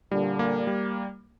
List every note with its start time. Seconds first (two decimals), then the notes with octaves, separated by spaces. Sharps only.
0.11 A#2 D3 G3
0.39 A#3
0.67 G3